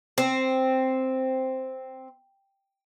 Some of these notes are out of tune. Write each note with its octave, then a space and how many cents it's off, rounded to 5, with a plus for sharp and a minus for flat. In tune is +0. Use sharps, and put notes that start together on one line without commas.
C4 +0